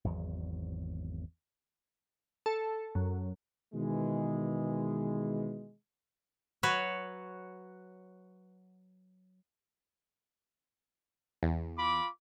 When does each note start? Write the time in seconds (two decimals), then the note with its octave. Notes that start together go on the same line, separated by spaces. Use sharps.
0.04 G#1 E2 F#3 G#3
2.46 A4
2.95 F#2
3.74 B2 D#3 E3 G#3
6.63 F#3 F#4 B4 C#5
11.43 E2
11.78 F4 B5 D6